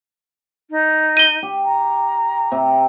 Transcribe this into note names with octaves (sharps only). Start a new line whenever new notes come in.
D#4
D#7 G7
G4
A#5
C3